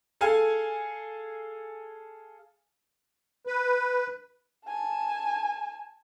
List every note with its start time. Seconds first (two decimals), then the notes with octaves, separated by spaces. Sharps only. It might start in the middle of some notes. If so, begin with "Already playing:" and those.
0.21 G#4 A4 F5 G#5
3.47 B4
4.67 G#5 A5